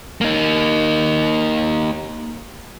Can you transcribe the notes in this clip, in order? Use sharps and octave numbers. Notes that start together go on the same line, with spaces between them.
A#3 D#4